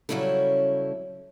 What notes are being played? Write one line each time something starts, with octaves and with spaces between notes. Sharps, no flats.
C#3 F#3 G3 C#4 E4 A4